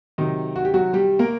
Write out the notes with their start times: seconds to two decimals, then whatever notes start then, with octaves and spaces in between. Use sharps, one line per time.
0.18 C3 D#3 F#3 D#4
0.56 F#4
0.65 G4
0.74 F#3 F#4
0.93 G3 G4
1.19 A#3 A#4